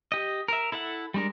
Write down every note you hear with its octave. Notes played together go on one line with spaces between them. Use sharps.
G4 D#5
A#4 E5
E4 A4 E5 F#5
G3 G#3 D4 A#4